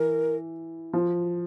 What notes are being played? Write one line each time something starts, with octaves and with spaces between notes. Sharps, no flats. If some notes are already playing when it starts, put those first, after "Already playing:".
Already playing: E3 A#4
F3